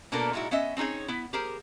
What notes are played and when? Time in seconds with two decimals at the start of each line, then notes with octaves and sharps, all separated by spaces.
0.12 B2 A#3 B3 D4 A4 A#4
0.33 A#2 G#3 D#4 E4 F#4
0.51 B3 C#4 D#5 E5
0.77 C4 C#4 D#4 G#4 C#5
1.08 B3 E4
1.33 G4 G#4 A#4 C5